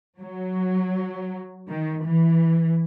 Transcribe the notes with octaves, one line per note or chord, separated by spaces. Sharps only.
F#3
D#3
E3